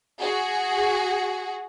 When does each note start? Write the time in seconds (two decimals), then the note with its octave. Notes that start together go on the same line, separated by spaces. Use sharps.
0.21 F#4 G#4